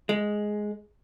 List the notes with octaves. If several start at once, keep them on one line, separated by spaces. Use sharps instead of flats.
G#3